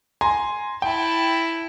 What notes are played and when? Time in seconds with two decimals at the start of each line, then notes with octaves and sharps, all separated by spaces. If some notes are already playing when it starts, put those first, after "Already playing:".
0.21 G#5 A#5 C6
0.82 E4 G5 A5